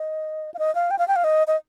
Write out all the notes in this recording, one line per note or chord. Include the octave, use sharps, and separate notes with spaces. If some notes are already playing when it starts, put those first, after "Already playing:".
Already playing: D#5
F5
D#5
F5
G5
F5
G5
F5
D#5
D#5